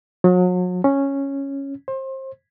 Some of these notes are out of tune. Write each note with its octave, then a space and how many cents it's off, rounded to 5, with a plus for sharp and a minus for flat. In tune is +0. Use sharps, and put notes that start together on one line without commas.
F#3 -40
C#4 -5
C5 +30